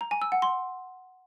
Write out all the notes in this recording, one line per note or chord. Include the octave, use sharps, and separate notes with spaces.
A#5
G#5
E6
F#5
C6